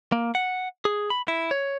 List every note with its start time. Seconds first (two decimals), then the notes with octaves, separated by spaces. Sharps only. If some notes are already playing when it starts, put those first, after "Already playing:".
0.12 A#3
0.35 F#5
0.85 G#4
1.10 B5
1.28 E4
1.51 C#5